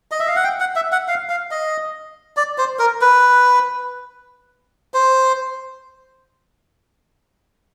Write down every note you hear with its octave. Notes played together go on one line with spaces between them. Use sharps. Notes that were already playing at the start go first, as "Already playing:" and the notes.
D#5
E5
F5
F#5
G5
F#5
E5
F#5
F5
F5
D#5
D5
C5
A#4
B4
C5